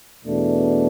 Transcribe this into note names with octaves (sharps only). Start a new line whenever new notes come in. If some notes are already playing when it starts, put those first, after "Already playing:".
E2 B2 A3 D4